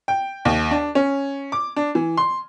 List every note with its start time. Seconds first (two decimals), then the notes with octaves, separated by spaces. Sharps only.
0.08 G5
0.45 D#2
0.71 D4
0.95 C#4
1.52 D6
1.76 D4
1.95 E3
2.17 C6